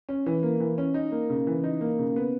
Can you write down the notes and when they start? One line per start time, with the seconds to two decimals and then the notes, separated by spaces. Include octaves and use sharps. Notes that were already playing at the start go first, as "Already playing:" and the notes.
0.09 C#4
0.26 E3
0.43 A#3
0.60 E3
0.78 C#4
0.94 D#4
1.12 A#3
1.30 C#3
1.47 E3
1.64 D#4
1.81 A#3
1.99 C#3
2.16 B3